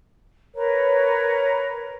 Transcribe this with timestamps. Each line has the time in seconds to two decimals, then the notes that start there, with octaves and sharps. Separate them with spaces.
0.55 A#4 B4 C#5 A#5